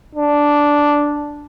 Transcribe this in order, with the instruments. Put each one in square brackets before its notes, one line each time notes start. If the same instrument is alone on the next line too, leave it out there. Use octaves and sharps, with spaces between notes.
[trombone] D4